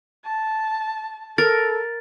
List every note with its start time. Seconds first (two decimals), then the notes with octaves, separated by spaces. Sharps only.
0.25 A5
1.38 A4 A#4 A6